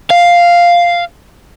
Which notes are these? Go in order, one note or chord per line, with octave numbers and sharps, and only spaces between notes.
F5